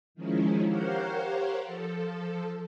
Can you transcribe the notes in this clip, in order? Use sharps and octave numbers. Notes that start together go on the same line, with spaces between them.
D#3 F3 G#3 C#4 D#4 E4
G4 A#4 C5 C#5 F5 F#5
F3 A4